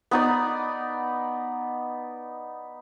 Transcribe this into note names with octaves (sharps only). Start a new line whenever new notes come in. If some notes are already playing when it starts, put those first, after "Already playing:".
B3 D#4 D5